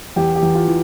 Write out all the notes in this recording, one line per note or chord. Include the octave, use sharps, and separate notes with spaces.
E2 G4
G4
E2
F4
E3